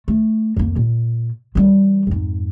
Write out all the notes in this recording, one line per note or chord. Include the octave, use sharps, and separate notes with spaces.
A3
F2 A#3
A#2
E3 G3
F2 G#2